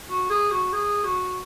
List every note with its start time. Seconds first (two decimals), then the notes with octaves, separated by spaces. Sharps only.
0.09 F#4
0.30 G#4
0.51 F#4
0.73 G#4
1.04 F#4